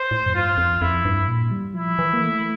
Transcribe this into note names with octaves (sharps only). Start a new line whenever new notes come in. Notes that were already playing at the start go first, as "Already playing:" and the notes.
Already playing: C5
A2
F2
G2 F4
F2
F2 E4
G2
A#2
G3
F3 E4
E3
A#3
A3